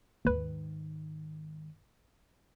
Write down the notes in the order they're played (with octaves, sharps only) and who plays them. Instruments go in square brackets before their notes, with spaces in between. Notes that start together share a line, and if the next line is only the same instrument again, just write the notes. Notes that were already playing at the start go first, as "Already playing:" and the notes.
[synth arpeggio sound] D#2 B4 [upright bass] G#2 D#3